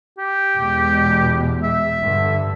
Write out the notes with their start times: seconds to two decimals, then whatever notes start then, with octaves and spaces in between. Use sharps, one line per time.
0.18 G4
0.57 E2 B2 G#3
1.63 E5
2.02 G2 D3